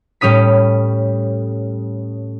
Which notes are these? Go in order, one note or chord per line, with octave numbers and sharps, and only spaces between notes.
A2 G3 C#4 D#6 B6